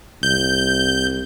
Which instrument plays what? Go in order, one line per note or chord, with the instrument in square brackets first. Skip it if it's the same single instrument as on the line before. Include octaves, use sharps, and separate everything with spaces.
[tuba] C2 [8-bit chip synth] G6